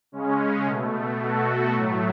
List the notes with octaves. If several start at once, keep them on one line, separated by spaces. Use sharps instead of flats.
C#3 G#3 C#4
B2 A3
B2 A3 F#4 A4
A2 F#3 A3